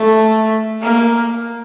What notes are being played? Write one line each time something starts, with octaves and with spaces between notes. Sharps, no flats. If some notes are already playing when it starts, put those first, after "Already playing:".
Already playing: A3
A#3